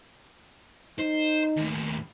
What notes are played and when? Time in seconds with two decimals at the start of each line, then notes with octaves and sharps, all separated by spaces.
0.99 D#4 C5
1.57 D#2 A2